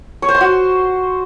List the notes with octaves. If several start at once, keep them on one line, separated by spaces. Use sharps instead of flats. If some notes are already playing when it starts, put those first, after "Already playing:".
C#5
C5
C6
F#4